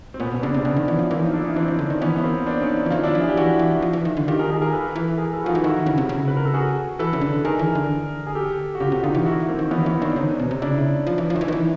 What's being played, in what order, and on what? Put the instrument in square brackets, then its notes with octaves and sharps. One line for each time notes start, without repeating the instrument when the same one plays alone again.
[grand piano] C4
[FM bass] A#2 [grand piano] B3 C#4
[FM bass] B2
[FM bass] C#3 [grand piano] C4 D4
[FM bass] C3
[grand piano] D4
[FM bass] C#3 [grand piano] B3 C#4
[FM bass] D#3
E3
F3
[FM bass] E3 [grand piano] A#3 C4
[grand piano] D#4 F4
D4 E4
C#4 D#4
[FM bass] E3 [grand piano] C4 D4
[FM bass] E3
D3
D#3
[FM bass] E3 [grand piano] B3 C#4
[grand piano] B3
A#3 C4
C4 D4
C#4 D#4
E4
[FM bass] E3
[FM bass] D#3 [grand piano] F4
[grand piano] D4 E4
[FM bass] F3
[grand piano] G#4
G4
[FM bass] E3 [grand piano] E4 F#4
[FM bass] E3
F3
E3
D#3
D3
[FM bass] D#3 [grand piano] F4 G4
[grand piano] G#4 A#4
G#4 A#4
G#4 A#4
A4 B4
[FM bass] E3
[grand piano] G#4 A#4
A4 B4
[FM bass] F3 [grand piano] D#4 F4 F#4
[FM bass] E3
[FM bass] D#3 [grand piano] E4 F#4
[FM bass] C#3
C3
C#3
[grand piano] B4
A#4
A4
F#4 G#4
[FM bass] E3 [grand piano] A4 B4
[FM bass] C#3
D3
[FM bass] D#3 [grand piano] G#4 A#4
[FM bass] E3
D3
[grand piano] G#4
G4 A4
F#4
[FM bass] C#3 [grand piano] F4 G4
[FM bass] C3
[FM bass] D3 [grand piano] D#4 F4
[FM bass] E3
[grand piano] E4 F#4
A#3 C4
[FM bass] D#3
[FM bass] E3 [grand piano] B3 C#4
[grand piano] C4
[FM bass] E3 [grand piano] B3 C#4
[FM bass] D#3 [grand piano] C4 D4
[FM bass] D3 [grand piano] C#4 D#4
[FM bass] B2
C3
[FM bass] C#3 [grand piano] D4 E4
[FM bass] F3
E3
F3
D#3
E3
D#3
E3